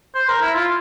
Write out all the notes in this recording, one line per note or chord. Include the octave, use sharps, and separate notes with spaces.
C5
A#4
E4
F4